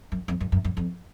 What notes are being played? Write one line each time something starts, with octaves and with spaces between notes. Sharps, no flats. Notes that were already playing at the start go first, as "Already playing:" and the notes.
F#2
F2
F#2
F#2
F#2
F2